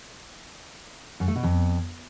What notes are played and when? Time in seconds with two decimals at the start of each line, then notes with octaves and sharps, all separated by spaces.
1.20 F#2
1.28 A3
1.36 B2
1.43 F2